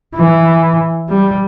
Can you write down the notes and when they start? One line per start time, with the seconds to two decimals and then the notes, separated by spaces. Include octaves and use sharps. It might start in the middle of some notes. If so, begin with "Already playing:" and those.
0.16 E3
1.09 G3